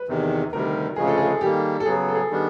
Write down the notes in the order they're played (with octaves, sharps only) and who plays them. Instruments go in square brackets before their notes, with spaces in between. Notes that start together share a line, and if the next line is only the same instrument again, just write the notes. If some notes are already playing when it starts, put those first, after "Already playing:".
Already playing: [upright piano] B4
[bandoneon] E2 C3 D#3
[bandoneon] D2 C3 D#3 G3 [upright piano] A#4
[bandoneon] D2 C#3 F3 G#3 [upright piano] G#4
[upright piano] A4
G#4
[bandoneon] D#3 G3 A#3 [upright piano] G4
[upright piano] A4
[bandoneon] C#3 F#3 B3 [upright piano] G#4
[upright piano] A4
G#4
[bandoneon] D#3 G3 B3 D4